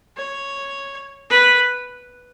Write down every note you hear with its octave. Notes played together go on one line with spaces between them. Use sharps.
C#5
B4